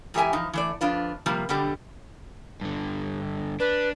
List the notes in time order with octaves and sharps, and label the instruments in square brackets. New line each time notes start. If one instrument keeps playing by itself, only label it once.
[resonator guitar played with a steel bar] G#2 E3 G4 A4 E5 G#5
E3 F3 D#4
E3 A3 D5
F2 D4 F4 B4
C3 F3 G3 A#3
B2 D3 F#3 G3 G4
[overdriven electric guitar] G2 D3
[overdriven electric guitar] D4 [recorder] B4